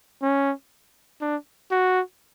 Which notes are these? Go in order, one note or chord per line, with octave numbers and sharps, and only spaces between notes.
C#4
D4
F#4